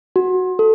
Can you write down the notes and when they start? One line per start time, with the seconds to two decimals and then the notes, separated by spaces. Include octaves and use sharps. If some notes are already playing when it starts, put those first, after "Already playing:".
0.16 F#4
0.59 A4